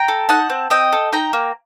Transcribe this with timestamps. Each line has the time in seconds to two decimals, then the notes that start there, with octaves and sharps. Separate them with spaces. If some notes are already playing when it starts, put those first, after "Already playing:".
Already playing: G5 A#5
0.08 A4
0.29 D#4 F#5 A5
0.50 C4
0.70 C4 D#5 G5
0.92 A4
1.12 D#4 G5 A#5
1.33 A#3